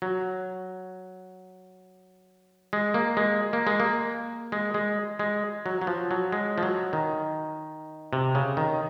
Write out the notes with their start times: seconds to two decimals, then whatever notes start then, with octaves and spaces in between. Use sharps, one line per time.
0.02 F#3
2.73 G#3
2.94 A#3
3.17 G#3
3.53 A#3
3.67 G#3
3.80 A#3
4.52 G#3
4.74 G#3
5.19 G#3
5.66 F#3
5.81 F#3
5.87 F3
6.11 F#3
6.32 G#3
6.58 F3
6.63 F#3
6.93 D#3
8.13 C3
8.35 C#3
8.57 D#3